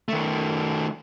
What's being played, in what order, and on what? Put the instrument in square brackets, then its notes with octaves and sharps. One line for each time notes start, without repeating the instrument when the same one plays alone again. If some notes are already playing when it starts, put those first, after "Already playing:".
[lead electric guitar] D#3 A3